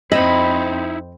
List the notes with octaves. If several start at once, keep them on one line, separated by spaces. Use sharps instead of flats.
F2 C4 D#4 E4 D#5 B5